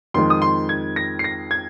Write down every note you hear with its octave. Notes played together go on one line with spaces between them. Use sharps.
F2 D#3 G#3 C6
D#6
C6
G#6
A#6
C7
A#6
G#6